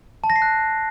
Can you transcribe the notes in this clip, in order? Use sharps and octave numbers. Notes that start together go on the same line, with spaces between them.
A5
A#6
C7
F#6